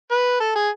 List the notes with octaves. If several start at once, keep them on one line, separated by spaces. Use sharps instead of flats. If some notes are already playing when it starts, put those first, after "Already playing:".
B4
A4
G#4